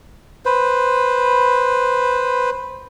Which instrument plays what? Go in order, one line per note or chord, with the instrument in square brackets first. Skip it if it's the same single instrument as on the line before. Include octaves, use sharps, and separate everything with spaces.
[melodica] B4 C5